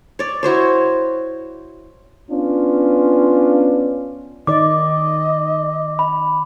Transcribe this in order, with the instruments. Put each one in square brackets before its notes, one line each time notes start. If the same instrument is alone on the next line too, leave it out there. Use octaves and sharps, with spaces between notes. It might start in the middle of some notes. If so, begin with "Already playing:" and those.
[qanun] C#5 D5
E4 F#4 C5 C#5
[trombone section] B3 C#4 D4 F4
[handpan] D#3 D5 [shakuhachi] D#5 [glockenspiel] D6
[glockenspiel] B5